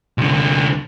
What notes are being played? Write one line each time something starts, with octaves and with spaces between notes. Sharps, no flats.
C2 D3